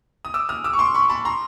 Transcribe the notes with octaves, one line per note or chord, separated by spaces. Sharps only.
D#6
D6 E6
D#6 F6
D6 E6
C#6
C6 D6
B5 C#6
A5 B5
A#5 C6